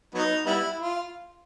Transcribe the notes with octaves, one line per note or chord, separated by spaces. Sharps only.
F#3 B3 D#4
G3 B3 E4
F4